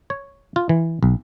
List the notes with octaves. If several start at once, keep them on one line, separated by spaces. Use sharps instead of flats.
C#5
F4
E3
B1